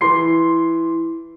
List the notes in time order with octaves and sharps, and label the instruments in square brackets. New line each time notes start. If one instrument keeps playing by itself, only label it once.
[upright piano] E3 C6 C7